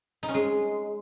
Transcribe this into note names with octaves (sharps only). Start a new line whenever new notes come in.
D#4
C#4
G#3